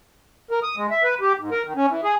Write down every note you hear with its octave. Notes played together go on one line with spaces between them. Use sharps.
A#4
D#6
G#3
E5
B4
G4
G#2
A#4
D#3
C#4
E3
G#4